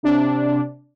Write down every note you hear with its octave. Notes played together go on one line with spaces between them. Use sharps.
C3 D4